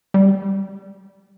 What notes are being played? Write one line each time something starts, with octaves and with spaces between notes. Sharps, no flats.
G3